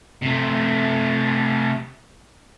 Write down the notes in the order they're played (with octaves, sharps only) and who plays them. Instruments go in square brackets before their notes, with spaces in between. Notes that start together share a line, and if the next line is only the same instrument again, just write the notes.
[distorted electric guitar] C3 A3